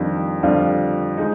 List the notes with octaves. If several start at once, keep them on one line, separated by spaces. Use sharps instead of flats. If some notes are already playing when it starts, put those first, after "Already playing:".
Already playing: F2 D#3 G3 D4 F4
F2 D3 G3 D4 F4
G#3 D#4